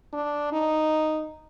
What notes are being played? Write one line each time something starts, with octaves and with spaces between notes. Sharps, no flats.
D4
D#4